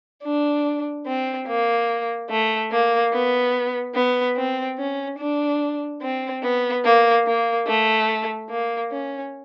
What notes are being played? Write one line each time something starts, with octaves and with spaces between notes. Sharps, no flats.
D4
C4
A#3
A3
A#3
B3
B3
C4
C#4
D4
C4
B3
A#3
A#3
A3
A#3
C#4